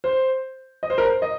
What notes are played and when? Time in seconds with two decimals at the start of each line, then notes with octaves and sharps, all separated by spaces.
0.04 C5
0.83 D#5
0.90 C5
0.98 A#4
1.05 C5
1.22 D#5